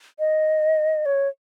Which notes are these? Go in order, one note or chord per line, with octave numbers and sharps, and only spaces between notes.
D#5
C#5